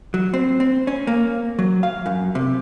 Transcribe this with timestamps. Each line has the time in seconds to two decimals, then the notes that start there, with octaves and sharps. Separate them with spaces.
0.14 F#3
0.34 C4
0.60 C4
0.87 C#4
1.07 A#3
1.59 F#3
1.83 F5
2.06 F#2
2.35 C3